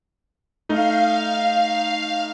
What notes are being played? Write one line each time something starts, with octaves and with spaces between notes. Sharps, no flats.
A3 D#4 F5